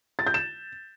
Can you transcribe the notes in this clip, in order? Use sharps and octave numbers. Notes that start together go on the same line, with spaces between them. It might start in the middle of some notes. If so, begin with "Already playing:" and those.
A6
G6
E7